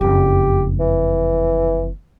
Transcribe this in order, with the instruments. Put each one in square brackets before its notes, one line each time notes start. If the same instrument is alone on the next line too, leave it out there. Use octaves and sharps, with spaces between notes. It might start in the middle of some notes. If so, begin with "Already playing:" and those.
[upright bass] F#1 F2 [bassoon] G4
[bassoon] E3